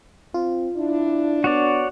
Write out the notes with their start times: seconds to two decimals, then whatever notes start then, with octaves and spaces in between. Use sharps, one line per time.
0.34 C4 F4
0.77 D4 E4
1.44 B3 F#4 C#5 D5